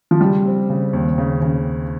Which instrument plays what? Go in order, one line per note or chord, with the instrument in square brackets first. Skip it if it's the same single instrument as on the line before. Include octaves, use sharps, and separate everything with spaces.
[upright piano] F3
[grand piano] C#3 [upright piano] G3
[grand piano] C4
C#3
D#2
C#3
C#3